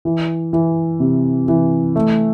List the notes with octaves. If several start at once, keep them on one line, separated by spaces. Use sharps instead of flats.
E3
E3
C3
E3
A3